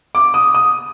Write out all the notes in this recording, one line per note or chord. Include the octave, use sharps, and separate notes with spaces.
D6
D#6
D#6